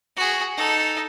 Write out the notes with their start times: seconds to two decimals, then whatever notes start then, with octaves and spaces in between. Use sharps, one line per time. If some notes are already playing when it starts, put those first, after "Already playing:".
0.17 F#4 G#4
0.57 D#4 A4